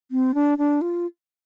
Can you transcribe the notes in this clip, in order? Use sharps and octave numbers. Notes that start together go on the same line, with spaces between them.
C4
D4
D4
F4